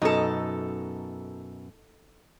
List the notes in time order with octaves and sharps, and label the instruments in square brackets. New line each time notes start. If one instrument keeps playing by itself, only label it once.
[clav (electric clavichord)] F#2 B2 [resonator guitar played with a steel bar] D#4 A4